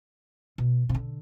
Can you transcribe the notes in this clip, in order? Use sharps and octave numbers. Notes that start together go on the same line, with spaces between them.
B2
C3
D3